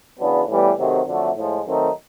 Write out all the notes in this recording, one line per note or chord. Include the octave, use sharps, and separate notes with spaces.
E2 C#3 F#3 B3 D4
A2 E3 G3 B3
C3 D#3 F#3 A3 C4
F2 D3 F#3 A3
A2 F3 G#3
D#3 F#3 A3 C4 D#4